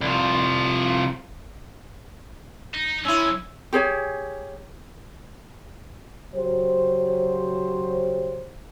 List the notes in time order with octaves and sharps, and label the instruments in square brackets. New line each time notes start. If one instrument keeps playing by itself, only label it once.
[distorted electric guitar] C2 F3
D#4
[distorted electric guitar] D#2 F3 [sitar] C#4 E4 [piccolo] E6
[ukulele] G4 G#4 C#5 G#5
[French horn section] C#3 F#3 G4 C5